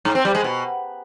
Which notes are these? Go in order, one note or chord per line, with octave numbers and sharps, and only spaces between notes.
G#2
C4
G3
G#3
B2